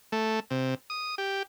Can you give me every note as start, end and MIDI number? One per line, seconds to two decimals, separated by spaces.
0.12 0.40 57
0.51 0.75 48
0.90 1.15 87
1.18 1.43 67